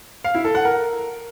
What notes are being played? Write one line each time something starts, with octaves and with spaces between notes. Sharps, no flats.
F5
E4
A4
F#5
A#4